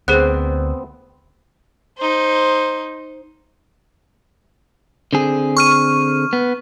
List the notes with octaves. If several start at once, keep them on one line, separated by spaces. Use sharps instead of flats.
D2 B3 C4 G#4 C5 F#6
D#4 C5
D3 C4 G#4
C#6 F6 D#7
B3